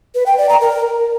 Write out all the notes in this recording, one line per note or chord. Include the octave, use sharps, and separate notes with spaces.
B4
G5
D5
A#5
A#4